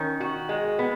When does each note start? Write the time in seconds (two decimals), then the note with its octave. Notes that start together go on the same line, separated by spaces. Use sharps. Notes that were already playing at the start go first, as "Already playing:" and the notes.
Already playing: D#3 C#4
0.20 F#4
0.49 G#3
0.79 B3